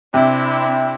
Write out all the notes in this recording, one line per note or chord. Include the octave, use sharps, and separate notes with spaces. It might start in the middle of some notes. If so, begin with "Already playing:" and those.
C3 C4 D4 E4